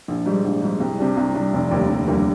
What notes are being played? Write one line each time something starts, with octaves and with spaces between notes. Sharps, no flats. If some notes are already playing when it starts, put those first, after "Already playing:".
A#1
G#2 G3
A#1
G#2 G3
C2
C3 G3 D4
C2
C3 G3 D4
F1
D#2 D3 G3 A#3
F1
D#2 D3 G3 A#3